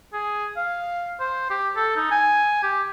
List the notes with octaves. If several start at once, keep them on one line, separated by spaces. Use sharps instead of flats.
G#4
F5
C5
G4
A4
D#4
G#5
G4